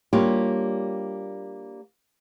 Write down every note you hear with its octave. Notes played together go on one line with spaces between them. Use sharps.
G3 A#3 D4 F4 G4 C#5